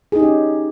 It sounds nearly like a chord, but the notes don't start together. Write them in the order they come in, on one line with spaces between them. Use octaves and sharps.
G#4 D#4 G4 C#4